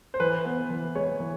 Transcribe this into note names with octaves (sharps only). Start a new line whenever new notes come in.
C5
E3 B4
B3
E3
G#3 C#5
E3